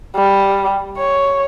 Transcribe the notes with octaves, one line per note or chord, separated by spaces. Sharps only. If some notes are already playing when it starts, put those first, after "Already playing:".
G3
C#5